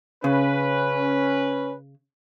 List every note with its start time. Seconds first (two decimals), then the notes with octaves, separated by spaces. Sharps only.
0.24 C#3 C#4 B4